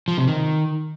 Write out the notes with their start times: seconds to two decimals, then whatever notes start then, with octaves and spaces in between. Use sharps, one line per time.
0.08 F3
0.18 C3
0.28 D#3